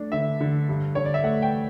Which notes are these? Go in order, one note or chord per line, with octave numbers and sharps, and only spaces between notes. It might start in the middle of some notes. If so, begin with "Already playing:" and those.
Already playing: A3 D4 D5
D3 E5
D3
G2
D3 C#5
D5
E5
A3 F#5
G5